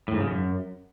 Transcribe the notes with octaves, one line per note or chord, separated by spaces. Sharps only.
A2
G#2
C#3
F#2